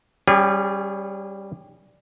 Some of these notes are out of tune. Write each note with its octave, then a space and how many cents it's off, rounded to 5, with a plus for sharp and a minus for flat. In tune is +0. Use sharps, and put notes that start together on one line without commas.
G3 +0 C#4 +0 G#4 -35